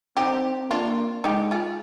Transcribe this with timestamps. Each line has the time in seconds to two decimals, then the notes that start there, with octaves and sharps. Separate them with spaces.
0.17 C4 D#4 G4
0.70 A#3 D4 F4
1.24 G#3 D#4 G4
1.51 F4 G#4